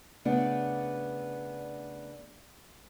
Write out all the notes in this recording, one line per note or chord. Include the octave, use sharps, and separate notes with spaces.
C#3 A3 B3 D4 D5 F#5